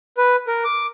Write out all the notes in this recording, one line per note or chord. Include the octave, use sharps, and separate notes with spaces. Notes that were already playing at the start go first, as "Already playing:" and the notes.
B4
A#4
D6